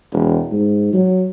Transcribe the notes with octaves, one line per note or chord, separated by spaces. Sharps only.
E1
G#2
F#3